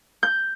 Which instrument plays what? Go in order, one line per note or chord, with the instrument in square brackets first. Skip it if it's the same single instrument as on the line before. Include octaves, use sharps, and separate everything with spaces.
[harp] G6